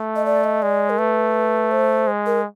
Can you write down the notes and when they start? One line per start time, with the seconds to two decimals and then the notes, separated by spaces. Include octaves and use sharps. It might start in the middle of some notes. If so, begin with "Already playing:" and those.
Already playing: A3
0.16 D#5
0.26 D5
0.44 D#5
0.62 G#3 D5
0.90 A#4
0.98 A3 B4
1.71 C5
2.07 G#3
2.26 A#4